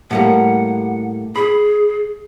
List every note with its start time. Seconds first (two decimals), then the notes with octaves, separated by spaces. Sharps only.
0.11 A2 G3 A#3 F#5
1.36 G#4 B5